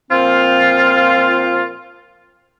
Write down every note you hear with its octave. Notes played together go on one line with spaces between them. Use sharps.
A#2 F3 C4 F4